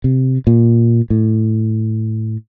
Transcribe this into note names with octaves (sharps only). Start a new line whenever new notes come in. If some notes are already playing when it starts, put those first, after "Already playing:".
C3
A#2
A2